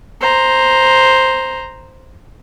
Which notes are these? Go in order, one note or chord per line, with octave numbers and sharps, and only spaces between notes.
C5 A#5